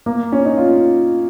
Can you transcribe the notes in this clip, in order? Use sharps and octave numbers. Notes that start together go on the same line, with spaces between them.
A#3
C#4
D#4
F4